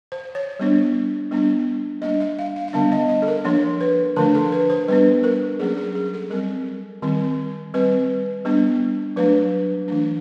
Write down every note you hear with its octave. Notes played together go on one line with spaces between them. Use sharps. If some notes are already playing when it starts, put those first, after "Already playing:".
C5
C#5
G3 B3 D4
G3 B3 D4
G3 A#3 D4 D#5
E5
F5
F5
F5
D3 G3 B3 D4 E5
D#5
D#5
A4
A#4
F3 A#3 D4 C#5
B4
D3 F3 A3 D4 A#4
A4
B4
C5
G3 B3 D4 B4
A#4
F#3 A#3 C#4 G#4
G#4
G#4
A4
G3 C4 A#4
D#3 G3 C4
G3 C4 B4
G3 B3 D4
F#3 A3 D4 B4
E3 A3 D4